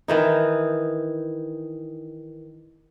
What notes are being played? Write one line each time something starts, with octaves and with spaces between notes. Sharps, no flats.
D#3 E3 D#4